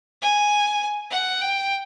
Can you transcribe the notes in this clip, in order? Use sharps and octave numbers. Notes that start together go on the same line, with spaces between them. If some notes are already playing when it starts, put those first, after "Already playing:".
G#5
F#5
G5